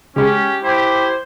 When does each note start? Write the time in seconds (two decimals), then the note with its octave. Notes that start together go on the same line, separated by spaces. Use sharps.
0.16 C#3 G#3 C#4 G4
0.64 E4 G4 C5